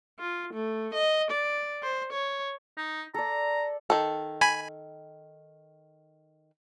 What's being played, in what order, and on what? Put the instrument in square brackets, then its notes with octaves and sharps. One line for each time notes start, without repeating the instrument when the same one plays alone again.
[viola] F4
A3
D#5
D5
C5
C#5
[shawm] D#4
[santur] A4 D5 [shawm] A#5
[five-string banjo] D#3 A4
[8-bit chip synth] G#5 B5